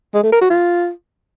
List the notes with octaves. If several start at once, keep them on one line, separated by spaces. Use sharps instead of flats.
G#3
A3
A#4
F#4
F4